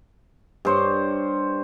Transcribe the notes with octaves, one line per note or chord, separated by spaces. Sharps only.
G2 C5 C#5